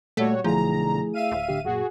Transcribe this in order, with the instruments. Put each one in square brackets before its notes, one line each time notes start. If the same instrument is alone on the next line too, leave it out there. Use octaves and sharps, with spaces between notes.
[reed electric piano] A#2 [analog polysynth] G3 F#4 C#5 [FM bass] A3
[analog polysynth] B1 D3 A#5 [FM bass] F3 [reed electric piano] A3 E4 G#4
[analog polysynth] E5 F5 D#7
[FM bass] D1
[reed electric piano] A2 D3 G4
[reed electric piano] F#2 A#2 [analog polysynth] F#4 G#4